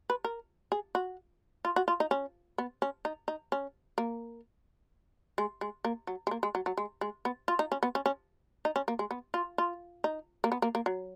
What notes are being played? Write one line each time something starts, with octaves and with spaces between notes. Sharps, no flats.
B4
A#4
G#4
F#4
F4
F#4
F4
D#4
C#4
B3
C#4
D#4
D#4
C#4
A#3
G#3
G#3
A#3
F#3
G#3
A#3
G#3
F#3
F#3
G#3
G#3
B3
F4
D#4
C#4
B3
C#4
C#4
D#4
C#4
A#3
G#3
B3
F4
F4
D#4
A#3
B3
A#3
A#3
F#3